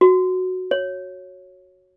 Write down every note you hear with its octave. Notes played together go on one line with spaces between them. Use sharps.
F#4
C#5